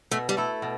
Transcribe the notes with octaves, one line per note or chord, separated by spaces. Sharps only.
B2 A3
G3
A3 E4 A4
B2